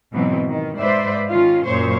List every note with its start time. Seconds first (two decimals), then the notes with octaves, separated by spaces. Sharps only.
0.13 G#2 B2 E3 F#3 C4
0.47 D#3
0.78 G#2 B4 C5 D5 E5
1.29 D#3 C#4 F4
1.66 F#2 A#2 C5 C#5